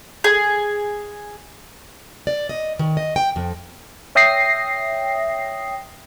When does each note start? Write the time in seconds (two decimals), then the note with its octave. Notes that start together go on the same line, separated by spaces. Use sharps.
0.24 G#4
2.27 D5
2.49 D#5
2.79 D#3
2.97 D#5
3.16 G5
3.36 F2
4.15 C#5 E5 G5 D#6 A#6 C7